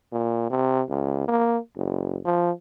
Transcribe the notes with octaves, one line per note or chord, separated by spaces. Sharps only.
A#2
C3
C#2
A#3
F#1
F3